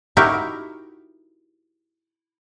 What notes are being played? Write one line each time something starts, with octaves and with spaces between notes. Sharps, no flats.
D#4 E4 F#4 G4 A#4 E5